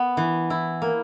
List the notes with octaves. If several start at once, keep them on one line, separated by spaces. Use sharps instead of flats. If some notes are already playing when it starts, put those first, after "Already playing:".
Already playing: B3
E3
E4
A#3